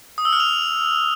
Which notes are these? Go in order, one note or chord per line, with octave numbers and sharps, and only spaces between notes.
D#6
E6
F6
F7